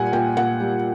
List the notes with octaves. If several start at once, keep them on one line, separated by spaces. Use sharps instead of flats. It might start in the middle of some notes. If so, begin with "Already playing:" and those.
Already playing: A#2 G3 F#5 G#5
A#2 G5
A#2 F#5
G3